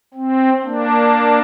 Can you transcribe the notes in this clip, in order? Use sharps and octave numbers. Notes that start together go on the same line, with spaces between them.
C4
A#3 D4